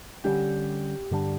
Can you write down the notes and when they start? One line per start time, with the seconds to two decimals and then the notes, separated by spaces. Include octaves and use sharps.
0.24 D3 G3 C#4 G4
1.11 G2 D3 G3 D4